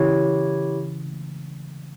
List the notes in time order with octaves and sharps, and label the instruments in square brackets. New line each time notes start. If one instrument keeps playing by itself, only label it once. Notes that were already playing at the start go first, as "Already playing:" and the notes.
Already playing: [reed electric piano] C#3 E3 [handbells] E4 G4 C#5